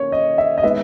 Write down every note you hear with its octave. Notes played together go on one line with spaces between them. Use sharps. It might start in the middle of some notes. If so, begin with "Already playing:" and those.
Already playing: A#3 C#4 C#5
D#5
E5
D#5
D#3 G#3 B3 E5